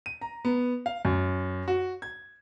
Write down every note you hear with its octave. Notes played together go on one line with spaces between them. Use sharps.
D#7
A#5
B3
F5
F#2
F#4
G#6